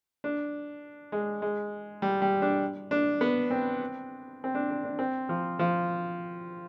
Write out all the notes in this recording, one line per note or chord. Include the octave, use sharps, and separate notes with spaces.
D4
G#3
G#3
G3
G3
D4
D4
B3
C4
C4
D4
D4
D4
C4
F3
F3